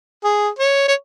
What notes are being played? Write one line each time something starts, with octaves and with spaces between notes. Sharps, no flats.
G#4
C#5
C#5